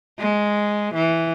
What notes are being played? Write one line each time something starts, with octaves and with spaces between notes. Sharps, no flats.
G#3
E3